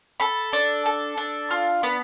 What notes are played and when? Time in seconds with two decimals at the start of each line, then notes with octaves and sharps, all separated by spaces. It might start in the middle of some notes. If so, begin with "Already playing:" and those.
0.20 A4 B5
0.53 D4
0.86 A4
1.17 D4
1.51 F4
1.83 B3